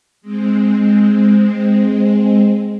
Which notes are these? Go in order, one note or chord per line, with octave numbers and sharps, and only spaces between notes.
G#3 C4